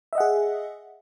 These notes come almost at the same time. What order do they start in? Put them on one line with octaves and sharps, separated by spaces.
E5 D#5 F#5 G#4